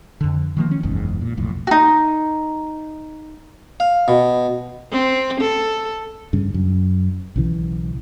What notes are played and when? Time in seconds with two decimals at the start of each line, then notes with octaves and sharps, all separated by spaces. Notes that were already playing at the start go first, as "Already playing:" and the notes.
0.21 F2 D3
0.57 D#3 F3 A#3
0.71 C#4
0.83 F#1 B1 E2 G#2
1.21 A#2
1.37 B1 F2 A2
1.67 D#4 F#4
3.80 F5
4.08 B2
4.91 C4
5.40 A4
6.33 G2 C#3
6.54 F#2
7.36 B1 C#3 E3